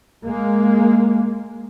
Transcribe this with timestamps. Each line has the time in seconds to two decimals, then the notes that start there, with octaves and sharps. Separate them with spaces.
0.24 G#3 A#3